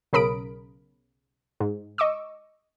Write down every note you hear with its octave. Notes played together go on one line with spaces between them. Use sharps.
B1 C#3 A#4 B5 D#6 D7
G#2
D#5 C#6 D6 E6